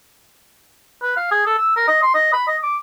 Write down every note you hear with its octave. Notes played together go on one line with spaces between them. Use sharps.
B4
F5
G#4
A4
E6
A#4
D#5
C6
D#5
B5
D#5
D6